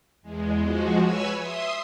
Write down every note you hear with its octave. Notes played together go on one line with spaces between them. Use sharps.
E2 G#3
F3 G#3 F#4
B4 C#5 G#5 E6
E5 C6 D#6